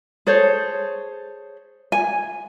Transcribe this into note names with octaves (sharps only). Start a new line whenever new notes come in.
G#4 A4 C5 C#5
G#5